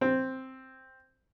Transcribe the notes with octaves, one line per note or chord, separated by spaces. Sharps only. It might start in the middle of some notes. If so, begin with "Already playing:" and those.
C4